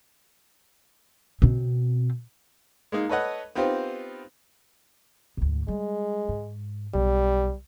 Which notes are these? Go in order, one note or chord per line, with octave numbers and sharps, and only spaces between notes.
B2 C4
G#3 A#3 D#4
A4 B4 C#5 D#5 F#5
B3 C4 D#4 F4 G4 C5
D2 G#2
G3 G#3
G#2
B1 G3